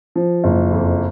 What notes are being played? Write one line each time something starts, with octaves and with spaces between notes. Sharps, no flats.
F3
F#1
F2